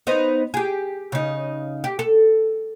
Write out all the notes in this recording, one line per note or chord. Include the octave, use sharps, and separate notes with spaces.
B3 D#4 C5
G4 G#4
C#3 D#4
G4
A4